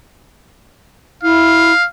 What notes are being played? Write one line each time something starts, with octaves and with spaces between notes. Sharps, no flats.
E4 F5